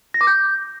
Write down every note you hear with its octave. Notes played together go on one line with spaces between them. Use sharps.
A#6
D6
G6